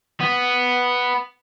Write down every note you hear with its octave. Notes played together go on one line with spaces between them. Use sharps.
B3